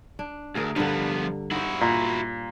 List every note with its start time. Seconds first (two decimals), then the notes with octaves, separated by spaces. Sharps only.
0.19 D4
0.55 D2 G#4 A#4
0.76 G2 D3 F3 B3
1.51 D#4 E4 F#4 C5
1.81 A#2